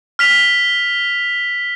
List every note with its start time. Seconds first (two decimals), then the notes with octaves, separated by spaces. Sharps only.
0.19 F6 B6 F7